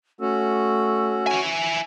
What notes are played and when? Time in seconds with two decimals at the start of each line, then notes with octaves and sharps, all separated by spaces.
0.21 A3 C#4 F#4 E6
1.27 E4 G#5